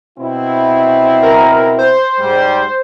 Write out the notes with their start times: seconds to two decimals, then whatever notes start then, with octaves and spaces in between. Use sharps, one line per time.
0.19 B2 C4 E4
1.23 A#4
1.79 C5
2.18 G#2 G3